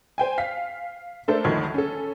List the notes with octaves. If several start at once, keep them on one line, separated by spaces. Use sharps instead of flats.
C5 G5 G#5
F5 B6
A3 D4 A4 A#4 C5
G1 D2 D#3 F3 G#6
C#4 A4